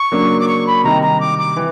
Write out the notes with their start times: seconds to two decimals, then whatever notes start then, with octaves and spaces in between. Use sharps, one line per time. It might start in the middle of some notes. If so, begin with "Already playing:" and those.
Already playing: C#6
0.12 C#3 F#3 A#3 D4
0.40 D6
0.48 C#6
0.67 B5
0.84 C3 D#3 G3 A#5
1.02 A#5
1.20 D6
1.39 D6
1.56 E3